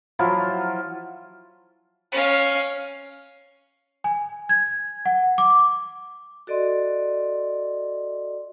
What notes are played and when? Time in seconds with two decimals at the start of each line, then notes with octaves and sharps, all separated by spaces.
0.19 F3 F#3 E4 F4
2.12 C#4 F5
4.04 G#5
4.49 G#6
5.06 F#5
5.38 D6
6.47 F#4 A4 D5 D#5 C6